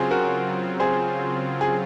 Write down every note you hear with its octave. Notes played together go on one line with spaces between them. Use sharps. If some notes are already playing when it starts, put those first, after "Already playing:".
Already playing: C#3 F#3 C4 F4 G#4 C5
F#4 A#4
G#4 C5
G#4